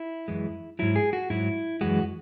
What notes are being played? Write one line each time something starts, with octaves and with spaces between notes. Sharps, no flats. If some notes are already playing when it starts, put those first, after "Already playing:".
Already playing: E4
F#2 E3 G#3
G#2 F#3 E4
G#4
F#4
G#2 F#3 E4
F#2 E3 G#3 F#4